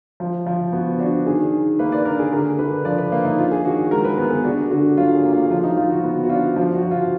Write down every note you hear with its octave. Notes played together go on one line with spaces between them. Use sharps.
F3
F3
B3 F#4
D4 F#4
D#3 G#4
D#3
A#3 B4
D5
D4 A#4
G#4
D3 A#4
D3 B4
F3 D5
B4
A#3
D#4
D4 F4
G#4
D#3 F#4
F#4
G#3 A#4
B4
B3 A#4
G#4
D4 F#4
D3 F#4
F#3 F4
G#4
A#3
F4
F3 F4
D#4
F3 F4
F#4
B3
F#4
D4 F4
F3 F4
F#4
F3
F4